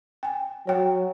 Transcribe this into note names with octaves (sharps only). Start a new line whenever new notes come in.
G5 G#5
F#3 C#5 G5